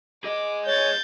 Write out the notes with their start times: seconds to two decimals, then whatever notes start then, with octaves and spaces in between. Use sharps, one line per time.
0.24 G#4 D#5 D6
0.66 C#5 G6 A6